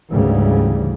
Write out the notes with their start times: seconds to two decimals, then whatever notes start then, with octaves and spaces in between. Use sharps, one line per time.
0.10 D2 G#2 C#3 E3 G3